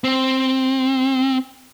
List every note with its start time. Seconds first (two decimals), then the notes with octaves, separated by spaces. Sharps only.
0.04 C4